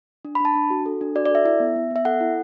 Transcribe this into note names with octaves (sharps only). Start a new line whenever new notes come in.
D4
B5
D4 A5
D4
F#4
A4
D4
F#4 D5
D5
A4 E5
E4 E5
B3
B3
B3 E5
A4 F#5
E4